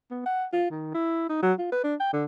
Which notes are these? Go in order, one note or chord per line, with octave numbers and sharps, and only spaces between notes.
B3
F#5
F4
D#3
E4
D#4
F#3
F4
B4
D4
G5
D3